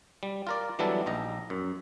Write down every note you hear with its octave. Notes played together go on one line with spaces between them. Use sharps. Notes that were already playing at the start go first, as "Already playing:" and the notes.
G3
F4 A#4 D5
E3 F#3 G3 B3 D4 A4
A#1 D#4 A#5
F#2